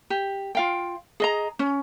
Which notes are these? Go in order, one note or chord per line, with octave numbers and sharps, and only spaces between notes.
G4
F4 F5 G5
G#4 D#5 A#5
C#4